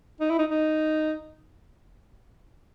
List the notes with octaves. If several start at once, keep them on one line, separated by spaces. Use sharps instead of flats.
D#4
E4
D#4
D#4